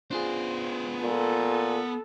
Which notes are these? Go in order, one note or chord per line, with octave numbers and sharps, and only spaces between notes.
B3 D4 F4 G#4 C5
A#2 A4